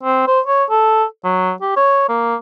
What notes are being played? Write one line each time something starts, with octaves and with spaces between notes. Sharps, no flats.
C4
C5
C#5
A4
F#3
G4
C#5
A#3